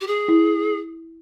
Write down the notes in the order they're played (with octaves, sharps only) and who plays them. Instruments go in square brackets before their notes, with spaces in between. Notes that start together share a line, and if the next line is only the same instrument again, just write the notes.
[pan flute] G4
G#4
[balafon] E4